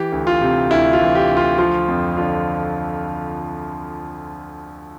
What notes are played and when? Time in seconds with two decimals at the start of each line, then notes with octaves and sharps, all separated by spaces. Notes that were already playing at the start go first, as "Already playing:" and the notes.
Already playing: E3 G4
0.12 D2
0.27 F4
0.41 C3
0.71 D2 E4
0.93 F4
1.00 E3
1.15 G4
1.29 D2
1.37 F4
1.58 F3 F4
1.88 F2
2.17 D3 F4